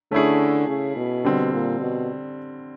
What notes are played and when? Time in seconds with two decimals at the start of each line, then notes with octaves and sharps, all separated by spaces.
0.12 D3 A3 C#4 E4 G#4
0.68 C#3
0.96 B2
1.25 D3 G3 C4
1.53 A#2
1.81 B2